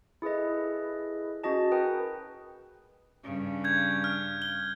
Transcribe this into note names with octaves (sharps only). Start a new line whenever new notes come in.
E4 G#4 A4 B4 D#5
C#4 F#4 G#4 D#5 A5
A#4 B4 G5 D#6
G2 C#3
G6 G#6
F6
G7